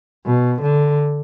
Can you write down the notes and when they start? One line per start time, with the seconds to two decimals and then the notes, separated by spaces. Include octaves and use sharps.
0.26 B2
0.63 D3